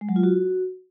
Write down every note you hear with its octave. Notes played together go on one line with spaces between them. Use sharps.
G#3
F#3
F4
F#4